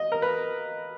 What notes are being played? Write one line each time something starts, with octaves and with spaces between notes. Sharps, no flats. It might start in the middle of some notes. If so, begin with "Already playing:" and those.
Already playing: D#5
A#4
B4